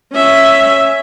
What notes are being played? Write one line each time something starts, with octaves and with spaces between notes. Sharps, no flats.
C#4 E5